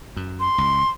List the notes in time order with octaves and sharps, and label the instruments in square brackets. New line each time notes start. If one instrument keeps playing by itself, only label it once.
[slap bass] F#2
[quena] C6
[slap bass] C#2